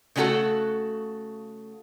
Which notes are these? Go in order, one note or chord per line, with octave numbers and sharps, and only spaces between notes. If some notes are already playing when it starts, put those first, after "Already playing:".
C#3 A3 C#4 F#4 A4 F#5